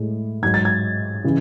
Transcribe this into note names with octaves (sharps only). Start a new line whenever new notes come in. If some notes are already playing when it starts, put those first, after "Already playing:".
Already playing: A2 G#3
G#2 F#3 G#6
A6
G#6
C#3 E3